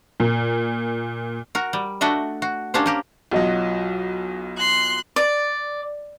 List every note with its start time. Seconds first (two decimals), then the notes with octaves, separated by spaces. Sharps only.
0.20 A#2
1.55 F#4 A#4
1.73 G3
2.01 A3 D4 F#4 D#5 E5
2.42 F#4
2.74 A#3 C#4 D4 G4 C5
2.86 A#3 G4 A#4
3.31 B1 F#3 F4 F#4 D#5
4.57 C6 F#6
5.16 D5